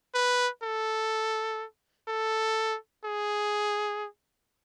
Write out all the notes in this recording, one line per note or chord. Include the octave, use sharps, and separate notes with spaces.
B4
A4
A4
G#4